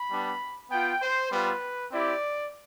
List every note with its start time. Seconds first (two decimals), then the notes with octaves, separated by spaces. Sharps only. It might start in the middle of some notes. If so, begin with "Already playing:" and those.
Already playing: B5
0.10 G3 B3 D4
0.71 B3 F4 G5
1.01 C5
1.31 G3 B3 F4 B4
1.91 C4 E4 G4 D5